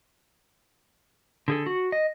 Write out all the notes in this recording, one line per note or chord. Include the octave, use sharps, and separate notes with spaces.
D3 G#4 A4
F#4
D#5